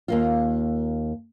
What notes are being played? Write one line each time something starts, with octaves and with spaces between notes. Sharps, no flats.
D#2 A#3 F4